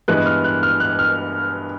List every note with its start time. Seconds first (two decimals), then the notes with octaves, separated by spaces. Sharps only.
0.08 G2 E3 G#3 B3 F#6
0.26 F6
0.44 F#6
0.63 F6
0.80 F#6
0.99 F6